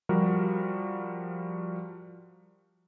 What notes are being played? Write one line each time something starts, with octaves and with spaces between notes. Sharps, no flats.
F3 G3 F#4 A#4